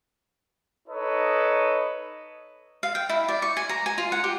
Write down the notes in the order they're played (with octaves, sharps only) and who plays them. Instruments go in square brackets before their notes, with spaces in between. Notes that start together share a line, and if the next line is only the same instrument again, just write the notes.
[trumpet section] D#4 A4 B4 C#5 D#5
[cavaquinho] F5
G5
E4
D5
C#6
G#5
A#5
G#5
F4
F#5
G4